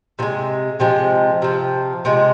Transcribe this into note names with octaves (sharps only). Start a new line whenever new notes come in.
C3 F3 G#3
C3 F3 G#3
C3 F3
C3 F3 G#3